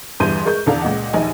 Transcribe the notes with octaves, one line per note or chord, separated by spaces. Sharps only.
G1 E2 G2 C6 G6 D#7
G#3 A#4 C#6 G6
E2 D3 A4 D5 F5 A#5
C#2 A#2 D#5 F#5
A#1 D#2 D#4 G#5